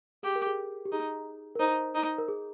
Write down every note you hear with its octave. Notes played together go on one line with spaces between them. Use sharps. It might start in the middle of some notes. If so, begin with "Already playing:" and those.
G4 G#4
A#4
G#4
G4
D#4 G#4
A#4
D#4 C5
D#4
A#4
G#4